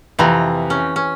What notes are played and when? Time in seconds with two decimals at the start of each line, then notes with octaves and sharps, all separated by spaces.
0.19 F2 C3 E3 A#5
0.70 C#4
0.96 C#4